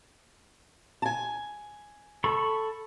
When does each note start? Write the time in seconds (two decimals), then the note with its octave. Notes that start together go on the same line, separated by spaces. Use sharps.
1.02 G#5 A5
2.24 A4 B5 C#6